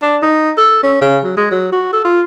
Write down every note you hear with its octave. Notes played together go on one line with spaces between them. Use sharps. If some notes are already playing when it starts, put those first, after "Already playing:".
D4
D#4
A4
C#4
C#3
F#3
G#3
F#3
F#4
A4
F4